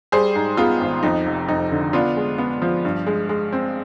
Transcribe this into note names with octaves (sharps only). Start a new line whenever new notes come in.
G3 G#4 C5
G#2
B3 F4 G#4
G#1
F2 D#4
F1
F2 D#4
D3
B3 D4 F4
G#3
B3
F3
G2
G#3
G#3
C4